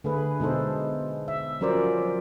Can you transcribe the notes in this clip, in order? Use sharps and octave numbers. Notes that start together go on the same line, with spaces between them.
D3 A3 G#4 B4
B2 G#3 D#4 A4 C5
E5
F3 F#3 C#4 A#4 C5 D5